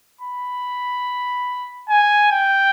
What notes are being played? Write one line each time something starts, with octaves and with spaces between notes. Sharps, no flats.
B5
G#5
G5